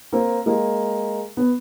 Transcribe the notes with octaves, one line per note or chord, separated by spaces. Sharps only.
A#3 C4
G#3 A#3
B3